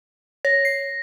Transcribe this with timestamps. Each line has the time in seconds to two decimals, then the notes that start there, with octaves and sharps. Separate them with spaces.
0.45 C#5 A#6
0.65 C7